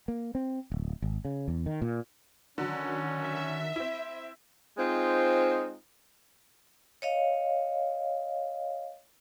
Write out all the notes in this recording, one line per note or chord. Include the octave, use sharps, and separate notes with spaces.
A#3
C4
D1
G#1
C#3
E2
D#3
A#2
D3 D#3 F#3 C#4
E5
C4 E4
G#3 C4 D#4 F4 C5
C#5 D#5 F5